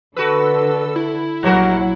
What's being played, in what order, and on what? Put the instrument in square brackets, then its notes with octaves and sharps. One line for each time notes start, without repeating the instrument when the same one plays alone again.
[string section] D3 A4 [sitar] F#4 B4 [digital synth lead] E6
[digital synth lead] E4
[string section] A#1 F#5 [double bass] F#3 [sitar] G3 F#4 A#4